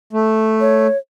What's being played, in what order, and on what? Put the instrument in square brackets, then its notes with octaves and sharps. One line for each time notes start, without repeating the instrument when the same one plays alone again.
[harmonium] A3
[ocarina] C#5